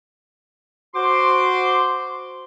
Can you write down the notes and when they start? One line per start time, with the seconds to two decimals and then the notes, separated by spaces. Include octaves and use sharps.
0.95 F#4 C5 C6 D6